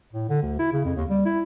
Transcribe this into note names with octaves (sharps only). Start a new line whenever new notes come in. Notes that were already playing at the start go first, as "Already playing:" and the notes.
A2
D3
D2
E4
C#3
F2
D#2
G3
E4